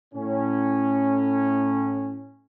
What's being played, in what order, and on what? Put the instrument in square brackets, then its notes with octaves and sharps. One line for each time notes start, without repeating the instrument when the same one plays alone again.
[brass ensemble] A2 C#4